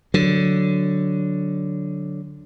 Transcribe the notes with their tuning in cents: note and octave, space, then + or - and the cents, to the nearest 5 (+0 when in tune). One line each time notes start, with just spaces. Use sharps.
D3 +0 F#3 +0